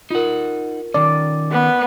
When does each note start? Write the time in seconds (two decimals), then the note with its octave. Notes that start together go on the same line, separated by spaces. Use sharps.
0.11 D#4 F4 A#4 F#5
0.94 D#3 C#4 D5
1.51 B3